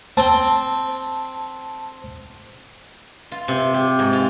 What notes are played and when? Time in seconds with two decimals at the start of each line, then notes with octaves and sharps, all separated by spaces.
0.17 C4 G5 A5
3.32 F4
3.48 C3
3.74 G4
3.99 G#2
4.13 F4